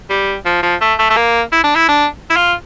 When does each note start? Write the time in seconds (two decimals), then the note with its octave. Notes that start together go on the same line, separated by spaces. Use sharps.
0.10 G3
0.46 F3
0.62 F3
0.81 A3
0.99 A3
1.10 A3
1.16 A#3
1.52 E4
1.64 D4
1.75 E4
1.89 D4
2.30 E4
2.36 F4